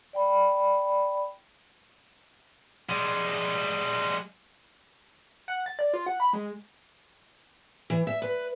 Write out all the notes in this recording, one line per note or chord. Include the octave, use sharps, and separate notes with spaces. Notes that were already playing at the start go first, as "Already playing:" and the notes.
D5 G5 B5
G3 G#3
F#5
A6
D5
F4
F#5
B5
G#3
E3
E5
B4